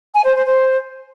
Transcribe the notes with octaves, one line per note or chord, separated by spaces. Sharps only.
G#5
C5
C5
C5